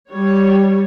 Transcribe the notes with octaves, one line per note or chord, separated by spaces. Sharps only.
G3 C#5